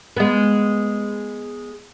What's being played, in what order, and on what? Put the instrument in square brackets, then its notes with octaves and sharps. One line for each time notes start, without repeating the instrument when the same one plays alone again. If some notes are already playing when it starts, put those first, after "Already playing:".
[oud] G#3 B3